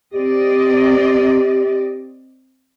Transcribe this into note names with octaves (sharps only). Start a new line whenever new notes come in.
C4 G4 D5 D#5